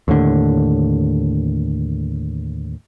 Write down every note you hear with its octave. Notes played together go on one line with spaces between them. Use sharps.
D#2 A2 D3